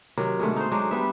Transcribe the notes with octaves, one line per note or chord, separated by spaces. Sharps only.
C3 D#3 F#3
B2 D3 G#3 A3
D#4 C5
F#3 G#3 D4 D#4
G3 B3 E5